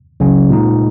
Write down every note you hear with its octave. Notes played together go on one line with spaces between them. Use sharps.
C#2 C#3 F#3 C#4
A#2 G#3 D#4